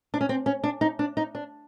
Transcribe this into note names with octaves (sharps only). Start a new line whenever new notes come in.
D4
C#4
C4
C#4
D4
D#4
D4
D#4
D4